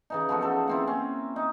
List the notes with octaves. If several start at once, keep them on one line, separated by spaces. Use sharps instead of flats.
C#3 E3 D#4
F3 B3 F#4 A4
C#3 A4 B4 C5
A#3 C4 E4
C4 C#4
D#4